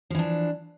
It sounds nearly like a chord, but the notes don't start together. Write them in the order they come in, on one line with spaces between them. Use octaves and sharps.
F3 E3 D4